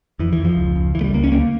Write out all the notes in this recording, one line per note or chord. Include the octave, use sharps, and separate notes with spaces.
F2 E3
E3
F2
F3
C#2
C#2
C#2 E3
A3
G3
C#2 A#3
C#4
D2 A#3